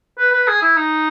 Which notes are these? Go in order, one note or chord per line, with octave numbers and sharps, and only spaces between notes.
B4
B4
G#4
E4
D#4